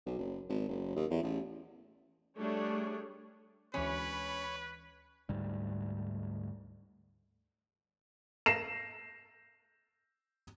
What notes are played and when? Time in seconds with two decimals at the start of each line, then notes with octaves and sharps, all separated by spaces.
0.06 B1
0.19 F#1
0.49 G#1
0.69 F#1
0.96 D#2
1.11 E2
1.23 A1
2.39 G3 A3 D4 G#4 C#5
3.74 D2 E3 G#3 C#4 B4 C#5 B5
5.29 D2 G#2 G3
8.46 A#6 C7 E7